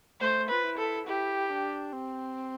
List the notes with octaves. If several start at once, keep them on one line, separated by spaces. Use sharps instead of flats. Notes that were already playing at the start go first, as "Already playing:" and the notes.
A3 C5
F4 B4
E4
A4
E4 G4
D4
C4